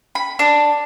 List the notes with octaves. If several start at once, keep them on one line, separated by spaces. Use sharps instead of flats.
B5
D4